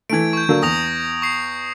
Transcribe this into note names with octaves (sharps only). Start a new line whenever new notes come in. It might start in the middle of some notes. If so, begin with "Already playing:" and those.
E3 A3 G#6 D7
C#6 G6
D3 F#3 A#3
E2 D#6 A#6 F7
C#6 C7